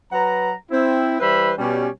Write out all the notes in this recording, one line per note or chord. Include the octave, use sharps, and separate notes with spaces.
F#3 B4 F#5 A#5
C4 E4
E3 G3 B4 C5 E5 B5
B2 G3 C#4